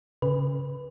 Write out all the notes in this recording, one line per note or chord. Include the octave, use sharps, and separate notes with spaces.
C#3 B4